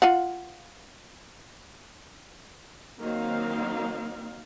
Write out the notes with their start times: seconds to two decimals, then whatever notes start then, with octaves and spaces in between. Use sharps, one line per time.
0.02 F4 F5 F#5
2.99 D#3 F#3 A#3 C4 D#4 F5